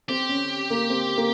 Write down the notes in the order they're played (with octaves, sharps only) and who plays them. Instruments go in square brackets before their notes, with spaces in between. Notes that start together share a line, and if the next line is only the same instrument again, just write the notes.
[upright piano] C4 [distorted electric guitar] G4
[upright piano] C#4
A#3
C4
A#3